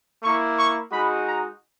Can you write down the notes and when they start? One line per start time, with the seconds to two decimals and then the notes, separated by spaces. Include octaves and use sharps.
0.22 A#3 E4 C#6
0.57 C#6
0.91 G#3 D#4 F#4 B5
1.25 A#5